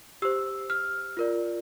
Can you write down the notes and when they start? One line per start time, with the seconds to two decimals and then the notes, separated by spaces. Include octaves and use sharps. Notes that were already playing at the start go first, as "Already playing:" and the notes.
0.22 G4 C5 E6
0.70 F6
1.17 F4 A#4 D5